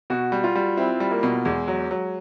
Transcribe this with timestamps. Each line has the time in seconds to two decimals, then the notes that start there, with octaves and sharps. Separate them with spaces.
0.10 B2 F#4
0.32 G3
0.44 F4
0.55 G3
0.77 C4 E4
1.00 G3
1.11 A#3
1.23 B2
1.45 E2 G#3
1.68 F#3
1.91 F#3